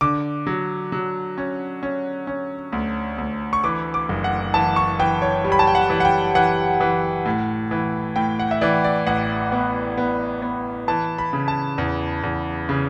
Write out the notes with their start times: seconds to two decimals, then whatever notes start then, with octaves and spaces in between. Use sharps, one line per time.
0.01 D3 D6
0.47 F#3
0.92 F#3
1.38 C#4
1.83 C#4
2.27 C#4
2.72 D2
3.18 D2
3.53 C#6
3.64 E3 D6
3.94 D6
4.09 F#1
4.24 F#5
4.54 E3 A5
4.76 C#6
4.99 E3 G5
5.22 C#5
5.44 G3
5.52 B5
5.59 A5
5.67 G5
5.75 F#5
5.90 E3
6.00 F#5
6.05 G5
6.35 E3 F#5
6.80 E3
7.25 A2
7.71 E3
8.16 A2 G5
8.39 F#5
8.51 E5
8.61 E3 D5
8.84 D5
9.07 A1 F#5
9.52 B3
9.98 B3
10.42 B3
10.88 E3 A5
11.18 B5
11.33 C#3
11.48 A5
11.78 E2
12.23 E2
12.69 C#3